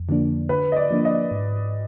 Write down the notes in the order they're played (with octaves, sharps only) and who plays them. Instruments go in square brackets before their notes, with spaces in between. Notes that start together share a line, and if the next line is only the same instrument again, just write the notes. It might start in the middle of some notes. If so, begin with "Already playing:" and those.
Already playing: [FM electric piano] F2
D3 F3 A#3 D4
[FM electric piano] D3 [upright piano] B4
[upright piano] D#5
D5
[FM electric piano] F3 A#3 D4
[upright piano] D#5
[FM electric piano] G#2